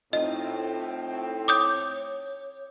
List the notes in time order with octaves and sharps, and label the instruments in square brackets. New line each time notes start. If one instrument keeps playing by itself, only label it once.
[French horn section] A2 C4 [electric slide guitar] D#4 F4 [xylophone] D#5
[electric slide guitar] C#5 [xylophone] D6 D#6 G6